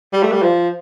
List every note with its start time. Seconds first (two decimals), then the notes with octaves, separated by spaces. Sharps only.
0.13 G3
0.23 A3
0.32 G3
0.42 F3